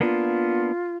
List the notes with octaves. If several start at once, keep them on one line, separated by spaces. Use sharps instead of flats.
A#3 B3 D4 F4